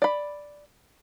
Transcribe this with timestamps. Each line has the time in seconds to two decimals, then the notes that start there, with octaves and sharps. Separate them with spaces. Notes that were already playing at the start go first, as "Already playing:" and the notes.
0.02 D5 B5